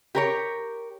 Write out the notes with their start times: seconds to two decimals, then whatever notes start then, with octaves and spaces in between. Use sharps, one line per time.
0.15 G4 A#4 C#5